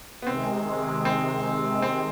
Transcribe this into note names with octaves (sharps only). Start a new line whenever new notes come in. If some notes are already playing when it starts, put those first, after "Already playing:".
B3
C3 D#3 G#3 C4
C4
C4